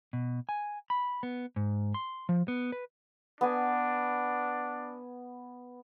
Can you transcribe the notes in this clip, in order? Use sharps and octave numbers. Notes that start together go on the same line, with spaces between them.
B2
G#5
B5
B3
G#2
C6
F3
B3
B4
B3 D4 G#5